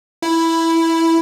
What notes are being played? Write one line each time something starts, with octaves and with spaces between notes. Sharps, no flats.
E4